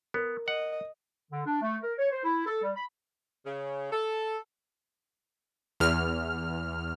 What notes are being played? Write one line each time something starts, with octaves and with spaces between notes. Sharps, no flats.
B3 A#4
D#5 F#5
D3
D4
A3
A#4
C#5
C5
E4
A4
G3
B5
C#3
A4
E2 F6